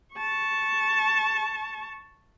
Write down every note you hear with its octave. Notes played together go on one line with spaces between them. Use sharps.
A5 C#6